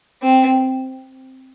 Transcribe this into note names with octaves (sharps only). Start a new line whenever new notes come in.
C4